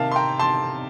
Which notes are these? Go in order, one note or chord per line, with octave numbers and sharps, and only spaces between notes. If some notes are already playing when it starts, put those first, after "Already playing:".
Already playing: C3 D#3 A#3 F5 A5
C6
G5 A#5
A5 C6